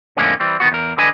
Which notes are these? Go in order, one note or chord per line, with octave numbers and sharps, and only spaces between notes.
F2 A2 D3 G#3 A#3 C#4
E3 G3 C4
D#3 E3 B3 F#4
E2 A#4
D3 B4 D#5 G#5